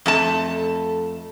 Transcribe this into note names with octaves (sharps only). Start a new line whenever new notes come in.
F2 A3 A5